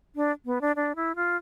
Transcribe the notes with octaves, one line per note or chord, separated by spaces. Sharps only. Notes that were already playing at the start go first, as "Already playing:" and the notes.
D4
B3
D4
D4
E4
F4